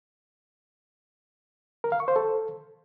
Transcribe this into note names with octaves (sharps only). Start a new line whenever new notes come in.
A#4
F5
C#6
C5
A4